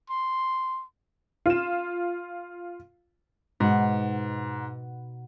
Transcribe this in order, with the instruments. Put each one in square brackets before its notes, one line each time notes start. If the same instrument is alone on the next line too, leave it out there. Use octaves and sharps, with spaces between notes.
[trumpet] C6
[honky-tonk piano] F4 E7
[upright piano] G#2 [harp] B2 D#4 F#5